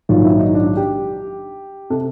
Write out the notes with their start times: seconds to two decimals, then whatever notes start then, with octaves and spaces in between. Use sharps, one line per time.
0.09 A#1 G#2 D#3 F#3 F4
0.24 E4
0.39 D#4
0.54 D4
0.77 G4
1.90 C3 A4